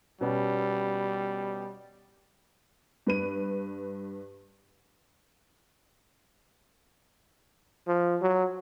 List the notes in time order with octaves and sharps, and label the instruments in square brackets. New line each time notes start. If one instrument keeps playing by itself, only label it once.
[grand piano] B2 B3 C#4 [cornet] G3
[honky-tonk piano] G2 B4 D#7
[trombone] F3
F#3